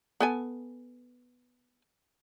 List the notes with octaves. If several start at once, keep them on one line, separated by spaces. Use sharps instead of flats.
B3 A4 G#5